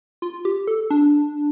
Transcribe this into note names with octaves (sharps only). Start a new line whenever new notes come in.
F4
G4
A4
D4